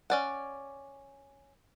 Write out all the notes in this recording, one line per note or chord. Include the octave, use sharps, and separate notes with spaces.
C#4 D5 F#5